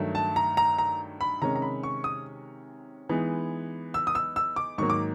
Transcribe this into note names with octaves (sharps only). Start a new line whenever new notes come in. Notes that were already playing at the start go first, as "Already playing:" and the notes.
Already playing: G2 D#3 F#3 A3
A5
A#5
A#5
A#5
B5
C3 D#3 G#3 C#4 A#5
A#5
B5
C#6
D#6
E3 G#3 B3 D#4
E6
D#6
E6
E6
D6
G#2 D#3 F#3 A#3 C#6
D6